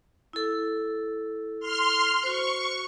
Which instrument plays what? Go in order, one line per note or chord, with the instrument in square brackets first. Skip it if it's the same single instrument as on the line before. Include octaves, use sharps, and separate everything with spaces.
[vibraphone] E4 A4
[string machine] C6 F6
[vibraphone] F#4 C5 [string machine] C#6